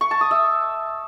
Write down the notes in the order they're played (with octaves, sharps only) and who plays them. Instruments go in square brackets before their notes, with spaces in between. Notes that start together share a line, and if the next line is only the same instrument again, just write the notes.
[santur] C#6
A5
D#6
E5